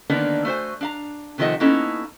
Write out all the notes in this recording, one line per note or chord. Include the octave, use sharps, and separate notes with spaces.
D3 D#3 A#3 B3 D4 D#4
A3 F#4 C5 G#5
D4 F5 A#5
C3 D#3 F3 A3 D#5 F#5
A#3 B3 C#4 D#4 E4 A4